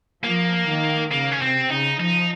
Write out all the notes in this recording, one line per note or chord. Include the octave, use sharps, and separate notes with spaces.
F3 A#3
D#3
C#3 A#3
C#4
C3 C4
C#3 D#4
F3 D#4